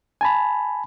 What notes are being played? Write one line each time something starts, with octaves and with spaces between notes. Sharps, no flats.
G#5 A5 B5